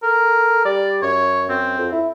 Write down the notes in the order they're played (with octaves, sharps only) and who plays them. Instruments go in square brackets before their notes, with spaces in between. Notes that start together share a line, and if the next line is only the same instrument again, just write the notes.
[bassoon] A4 [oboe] A#4
[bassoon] G3 [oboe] D5
[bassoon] F#2 [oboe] C#5
[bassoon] F#2 [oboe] C4
[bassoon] F2
E4